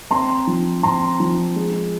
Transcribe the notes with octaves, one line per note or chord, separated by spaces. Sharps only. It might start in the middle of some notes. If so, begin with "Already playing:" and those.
C4 A#5 C6
F3
C4 A#5 C6
F3
G#3